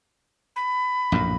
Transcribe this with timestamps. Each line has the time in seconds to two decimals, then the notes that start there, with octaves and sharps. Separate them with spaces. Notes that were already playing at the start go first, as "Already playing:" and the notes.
0.56 B5
1.12 A#1 F#2 A2